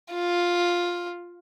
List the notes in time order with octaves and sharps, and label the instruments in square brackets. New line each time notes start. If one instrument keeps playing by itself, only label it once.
[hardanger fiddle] F4